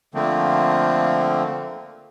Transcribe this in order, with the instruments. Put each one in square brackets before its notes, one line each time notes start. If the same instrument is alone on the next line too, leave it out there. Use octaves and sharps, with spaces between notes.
[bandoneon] D3 F3 A3 A#3 C4